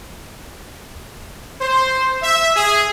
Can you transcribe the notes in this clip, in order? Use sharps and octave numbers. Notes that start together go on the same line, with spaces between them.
C5
E5
G#4